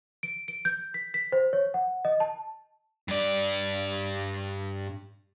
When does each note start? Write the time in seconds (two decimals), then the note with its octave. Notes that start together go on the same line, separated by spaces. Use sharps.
0.23 D7
0.48 D7
0.65 G6
0.94 B6
1.14 B6
1.32 C5
1.53 C#5
1.74 F#5
2.05 D#5
2.20 A5
3.08 G2 D5